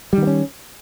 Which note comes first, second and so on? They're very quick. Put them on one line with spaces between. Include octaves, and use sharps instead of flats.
G3 D#3 B3 C#4